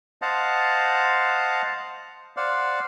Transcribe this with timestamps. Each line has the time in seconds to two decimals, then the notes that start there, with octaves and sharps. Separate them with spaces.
0.22 C5 D#5 F5 F#5 A5
2.37 C5 D5 F5 F#5